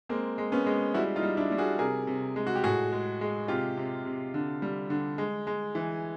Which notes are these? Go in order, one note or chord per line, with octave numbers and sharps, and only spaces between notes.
G#3 A#3 C4
G#3
B3 C#4
G#3
G3 E4 F#4
D#4 F4
G3
D4 E4
G3
F#4 G#4
C3 G#4 A#4
C3
G#3
F#4
G4
A2 F#4 G#4
G#3
G#3
C3 F4 G4
C3
C3
D3
G3
D3
G#3
G#3
E3